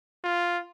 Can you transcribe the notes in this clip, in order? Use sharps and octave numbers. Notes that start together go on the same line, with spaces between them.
F4